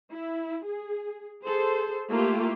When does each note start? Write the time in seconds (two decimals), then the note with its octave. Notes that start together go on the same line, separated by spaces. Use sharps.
0.10 E4
0.64 G#4
1.43 G#4 A4 C5
2.09 A3 A#3 E4 F4 G4